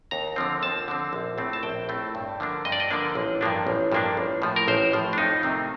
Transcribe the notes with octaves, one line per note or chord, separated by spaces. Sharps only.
D#2 A#5
D3 F3 C4
D#2 A5
D3 F3 C4
A#1
A2 A3 C4
A5
A#1 G5
A2 A3 C4
G2
D3 F3 A#3 D4
G2 D#5
D5
D#5
D3 F3 A#3 D4
A1
G2 F3 A#3 D4
A1
G2 F3 A#3 D4
A1
A2 F3
A#4
A1 C5
A2 F3
D4
F2 D#4
C3 D#3 A3 C4